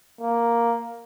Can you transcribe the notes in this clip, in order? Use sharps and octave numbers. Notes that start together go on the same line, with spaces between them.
A#3